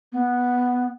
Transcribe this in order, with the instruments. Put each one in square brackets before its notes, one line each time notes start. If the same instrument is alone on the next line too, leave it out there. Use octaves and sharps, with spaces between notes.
[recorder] B3